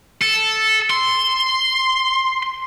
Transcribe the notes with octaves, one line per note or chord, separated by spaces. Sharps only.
A4
C6